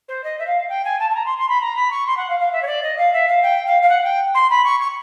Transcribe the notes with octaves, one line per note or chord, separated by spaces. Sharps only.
C5
D#5
E5
F5
G5
G#5
A5
A5
A#5
C6
C6
B5
A#5
B5
C#6
C6
F#5
F5
F5
E5
C#5
D5
D#5
F5
E5
F5
G5
F5
F5
F#5
G5
C6
B5
C#6
C#6